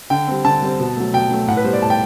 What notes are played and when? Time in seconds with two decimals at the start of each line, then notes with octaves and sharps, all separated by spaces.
0.10 D3 G5
0.28 G3 C4
0.45 D3 A5
0.62 G3 C4
0.80 B2
0.97 F#3 A3
1.14 B2 G5
1.31 F#3 A3
1.48 A2 F#5
1.57 B4
1.64 G3 B3 C5
1.73 D5
1.82 A2 A5
1.90 G5